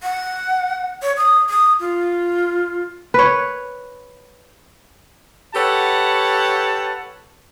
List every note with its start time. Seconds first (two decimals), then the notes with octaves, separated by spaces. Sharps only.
0.03 F#5
1.03 C#5
1.17 D#6
1.49 D#6
1.80 F4
3.14 B4 C#5
5.54 G4 A4 B4 C#5 F#5 A5